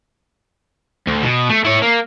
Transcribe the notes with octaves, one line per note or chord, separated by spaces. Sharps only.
D2
B2
A3
E4 C#5
A#3